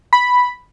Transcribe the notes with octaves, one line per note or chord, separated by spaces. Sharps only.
B5